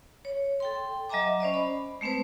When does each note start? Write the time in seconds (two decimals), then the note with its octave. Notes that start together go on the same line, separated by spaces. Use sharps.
0.25 C#5
0.60 A4 G5 C6
1.10 F#3 D#5 E5 G#5 A#5 D6
1.40 C#4 C5 D5 D#5
1.54 B5
2.01 G#3 A3 C4 B4 C5